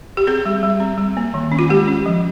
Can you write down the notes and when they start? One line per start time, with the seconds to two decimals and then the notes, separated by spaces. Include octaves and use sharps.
0.17 G4
0.27 C4 G#4
0.46 G3
0.63 G3
0.80 C4
0.98 G3
1.17 A#3
1.34 D#3
1.52 C#4
1.59 F4
1.69 G#3 G4
1.88 C#4
2.06 F3